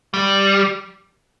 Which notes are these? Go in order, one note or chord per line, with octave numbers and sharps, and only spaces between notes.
G3